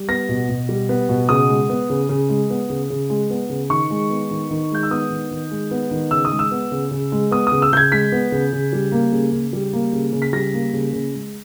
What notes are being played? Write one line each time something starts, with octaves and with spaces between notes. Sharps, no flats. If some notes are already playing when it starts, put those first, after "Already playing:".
Already playing: G3
B3 A#6
B2
B2
G3
B3
B2
C#3 D#6
G#3
B3
C#3
C#3
G#3
B3
C#3
C#3
G#3
B3
C#3
D#3 C#6
G#3
B3
D#3
D#3
G#3 G6
E6
B3 D#6
D#3
D#3
G#3
B3
D#3
C#3 E6
D#6
G#3
E6
B3
C#3
C#3
G#3
B3 D#6
D#6
C#3
E6
C#3 G6 G#6
G#3 B6
B3
C#3
C#3
G3
A#3
C#3
C#3
G3
A#3
C#3
C#3
B6
G3 A#6
A#3
C#3
C#3
G#3